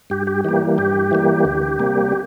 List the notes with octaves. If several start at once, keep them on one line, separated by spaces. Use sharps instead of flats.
G2 G4
G4
E3 G3 A#3 G4
G2 G4
E3 G3 A#3
D2
C3 G3 A#3